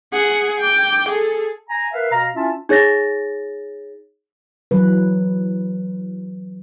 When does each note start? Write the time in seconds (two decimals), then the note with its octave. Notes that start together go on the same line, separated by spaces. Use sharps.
0.13 G#4 F#5
0.60 G5 D6
1.09 G#4 A4
1.69 G#5 A#5
1.93 A#4 B4 E5 F5
2.12 B2 F5 A#5
2.35 C#4 E4 F4 E5 A5
2.69 D#4 G#4 C#5 A6 A#6
4.71 E3 F#3 B4